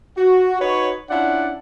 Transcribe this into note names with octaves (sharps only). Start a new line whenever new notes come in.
F#4
D#4 F#4 B4 C#5
C#4 D4 E4 F4 D5 F#5